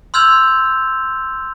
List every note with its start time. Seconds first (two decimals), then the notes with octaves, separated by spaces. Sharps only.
0.14 C6 E6 F6 G6 G#6 F7